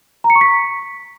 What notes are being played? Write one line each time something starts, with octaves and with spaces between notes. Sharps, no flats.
A#5
C#7
C#6
B6